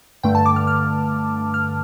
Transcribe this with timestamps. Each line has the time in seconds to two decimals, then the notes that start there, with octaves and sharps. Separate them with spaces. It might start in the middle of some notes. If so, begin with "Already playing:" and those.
0.23 G2 D3 A3 G5
0.35 A5
0.46 D6
0.56 F6
0.67 F6
1.54 F6